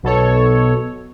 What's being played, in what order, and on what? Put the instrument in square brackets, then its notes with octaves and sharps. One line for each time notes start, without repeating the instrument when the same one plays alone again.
[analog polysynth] B1 B2 A4 C#5